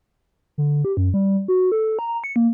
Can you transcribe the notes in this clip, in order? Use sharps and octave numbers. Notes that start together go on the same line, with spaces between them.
D3
G4
F#2
G3
F#4
A4
A#5
C#7
A#3